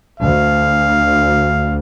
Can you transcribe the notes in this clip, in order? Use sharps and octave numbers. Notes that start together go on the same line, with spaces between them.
D2 F5